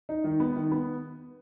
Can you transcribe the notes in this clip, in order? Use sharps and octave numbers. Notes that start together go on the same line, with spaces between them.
D#4
D#3
B3
D#3
B3